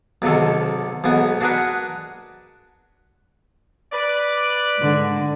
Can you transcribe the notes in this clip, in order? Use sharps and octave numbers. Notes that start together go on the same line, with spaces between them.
B1 G#2 C3 D#3 A4
B1 G#2 B3 G#5
D4 F#4 G#4 A#4 B4
B4 D5
G#2 D3